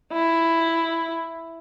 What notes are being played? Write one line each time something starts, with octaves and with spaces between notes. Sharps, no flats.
E4